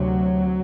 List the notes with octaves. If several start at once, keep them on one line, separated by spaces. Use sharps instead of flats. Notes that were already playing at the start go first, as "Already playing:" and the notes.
Already playing: D2 C3 F#3